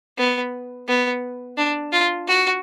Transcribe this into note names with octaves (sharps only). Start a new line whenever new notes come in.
B3
B3
D4
F4
F#4